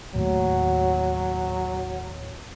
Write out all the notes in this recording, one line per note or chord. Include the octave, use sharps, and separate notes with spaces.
D#2 A2 F#3